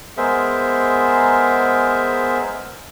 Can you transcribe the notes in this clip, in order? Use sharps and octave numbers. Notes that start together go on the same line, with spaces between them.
G#3 B3 G#4 A#4 C5 E5